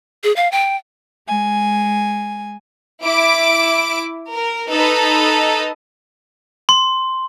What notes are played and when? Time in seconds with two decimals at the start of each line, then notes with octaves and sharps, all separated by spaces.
0.24 G#4
0.36 F5
0.52 G5
1.28 G#3 G#5
3.03 E4 D6 D7
4.32 A#4
4.70 D#4 A4 B4 D#5
6.69 C6